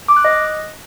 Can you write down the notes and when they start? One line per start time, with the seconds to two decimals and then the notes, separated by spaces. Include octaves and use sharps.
0.08 D6
0.16 F#6
0.25 D#5